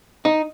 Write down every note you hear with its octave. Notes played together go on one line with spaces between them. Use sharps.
D#4